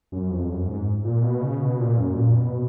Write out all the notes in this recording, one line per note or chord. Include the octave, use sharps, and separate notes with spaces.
F#2
F2
F#2
G#2
A#2
B2
C#3
B2
A#2
F#2
A#2
B2